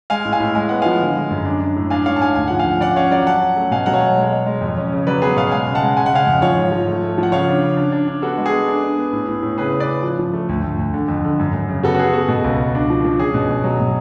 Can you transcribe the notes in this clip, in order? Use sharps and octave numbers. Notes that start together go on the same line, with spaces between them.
G#3 F5 G#5
A2
F5 G#5
A2
G#3 G#5
B3 F#5
F3 F5 G#5
D3
G#3
F#2
D4
D4
A2
D4 F5 G#5
G#2 C#5 F5
A5
G#2 F5 G#5
D2 G#5
F3 F#5
F5 G#5
F3
C#4 D5 F#5
C#4 C#5 F5
F#3 D5 F#5
C#4 F#5 A5
C#4
A3
B2 F5 G#5
F#3 F#5
C#5 F5
B2
G#3
G#3
G#3
F2
C#4
C#3
F#3 B4 D5
B3 G#4 B4
B2 C#5 F5
G#3 F5 G#5
C#3
F#5 A5
G#3
C#3 G#5
F#5
C#3 F5 G#5
F2
F3 C#5 F5
G#2
F3
A3
A3
F3 F#5
C#3 C#5 F5
D4
C#3
D4
D4
D4
B3 F#4 A4
G#3
G#4
B3
D4
D4
B3
A2
A2
A2
C#3 G#4 B4
C#3
B4 D5
C#3
F3
F3
A3
D2
D2
D2
D3
F2
D3
F#2
F#2
C#3
B3 F#4 A4
F#4
B3 G#4
B3 F#4
B2
C#2
C#2
D4
F3
F3
C#4 G#4
B2
B2
F#3
B2